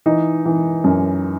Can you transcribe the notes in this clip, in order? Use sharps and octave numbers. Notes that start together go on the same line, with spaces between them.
E3 D#4
E3
F#2